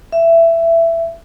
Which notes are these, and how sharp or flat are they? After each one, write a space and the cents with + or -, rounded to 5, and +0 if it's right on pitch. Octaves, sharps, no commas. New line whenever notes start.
E5 +15